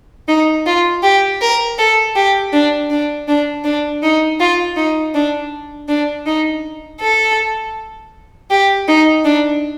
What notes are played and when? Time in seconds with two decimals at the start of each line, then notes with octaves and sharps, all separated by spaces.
0.28 D#4
0.66 F4
1.03 G4
1.41 A#4
1.79 A4
2.16 G4
2.53 D4
2.91 D4
3.28 D4
3.64 D4
4.03 D#4
4.40 F4
4.77 D#4
5.15 D4
5.89 D4
6.26 D#4
7.01 A4
8.51 G4
8.88 D#4
9.25 D4